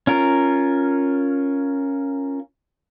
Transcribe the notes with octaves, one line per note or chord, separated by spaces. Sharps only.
C#4 F4 A#4